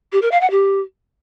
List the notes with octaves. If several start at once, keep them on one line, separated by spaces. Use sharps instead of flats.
G4
A#4
F5
F#5
G4